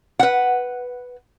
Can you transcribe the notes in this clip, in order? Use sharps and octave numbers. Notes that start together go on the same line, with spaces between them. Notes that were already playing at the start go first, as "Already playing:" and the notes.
B4 F#5